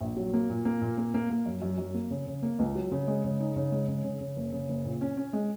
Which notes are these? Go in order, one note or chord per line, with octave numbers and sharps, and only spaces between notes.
A#1
F#3
A#3
A#2
A#3
A#2
A#3
A#3
A#3
F#2
F#2
F#2
A#3
C#3
C#3
A#3
C#2
F#3
C#3
G#3
C#3
D#4
C#3
G#3
C#3
C#3
C#3
F#1
C#3
F#1
A#2
C#4
C#4
G#3